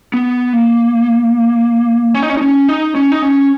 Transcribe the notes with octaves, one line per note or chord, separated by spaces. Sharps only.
B3
A#3
C#4
D#4
C#4
D#4
C#4
D#4
C#4
D#4
C#4